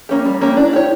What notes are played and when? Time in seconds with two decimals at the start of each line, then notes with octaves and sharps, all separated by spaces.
0.09 A#3 C#4 G4
0.26 G3
0.41 A#3 C#4 G4
0.57 D4 E4
0.73 G4 C#5